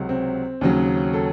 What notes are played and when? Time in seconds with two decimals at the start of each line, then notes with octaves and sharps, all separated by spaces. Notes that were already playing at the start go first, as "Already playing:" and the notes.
Already playing: C#2 C3 F#3
0.09 C4
0.61 D#2 C#3 F#3
1.13 A4